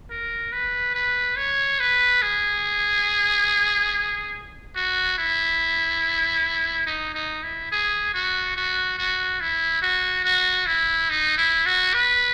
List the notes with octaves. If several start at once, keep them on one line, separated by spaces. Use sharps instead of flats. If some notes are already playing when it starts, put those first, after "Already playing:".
A#4
B4
B4
C#5
B4
G#4
F#4
E4
D#4
D#4
E4
G#4
F#4
F#4
F#4
E4
F#4
F#4
E4
D#4
E4
F#4
B4